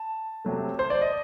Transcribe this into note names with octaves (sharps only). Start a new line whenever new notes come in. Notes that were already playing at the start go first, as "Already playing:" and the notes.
Already playing: A5
C3 F#3 A3
C5
D5
D#5